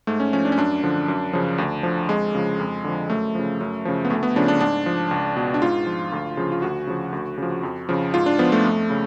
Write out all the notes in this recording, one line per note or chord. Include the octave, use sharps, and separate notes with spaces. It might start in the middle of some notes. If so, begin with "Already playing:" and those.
G#2 A3
C#4
F3 C#4
D4
C#4
F#2 D4
D3 F3
F#2
C#3 F3
D2
D3 F3
F2 G#3
C#3 F3
F2
D3 F3
F#2 A3
C#3 F3
F#2
C#3 F3
B3
D2 A3
B3
C#3 F3 D4
D4
G#2 D4
F3
C#2
B2
D4
G#2 F4
F3
D2
C#3 F3
F4
D2 F#4
C#3 F3
D2
C#3 F3
F2
C#3 F3
G#2 F4
D4
F3 B3
A3
F2
C#3